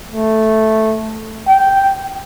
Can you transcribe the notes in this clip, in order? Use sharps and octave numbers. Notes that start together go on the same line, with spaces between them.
A3
G5